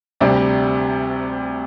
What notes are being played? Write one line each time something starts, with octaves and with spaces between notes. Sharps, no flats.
D2 C3 G3 D4